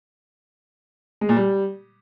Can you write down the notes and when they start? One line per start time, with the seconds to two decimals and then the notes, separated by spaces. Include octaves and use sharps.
1.21 G#3
1.29 A#2
1.36 G3